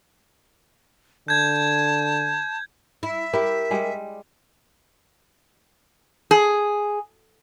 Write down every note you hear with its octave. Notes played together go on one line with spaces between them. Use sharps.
D3 A5 G6 G#6
E4 E5
E4 G4 A#4
G3 G#3
G#4